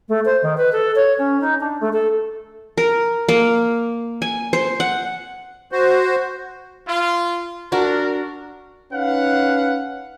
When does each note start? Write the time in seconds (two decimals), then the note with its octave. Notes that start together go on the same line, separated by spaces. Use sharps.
0.08 A3
0.25 C5
0.42 D#3
0.57 B4
0.72 A4
0.95 C#5
1.18 C#4
1.41 D#4
1.60 D4
1.80 A3
1.92 A4
2.78 A#4
3.29 A#3
4.22 G#5
4.53 C5
4.80 F#5
5.72 F#4 C5
6.88 F4
7.72 D4 F#4 A#4
8.93 C#4 D#4 B4 F5 F#5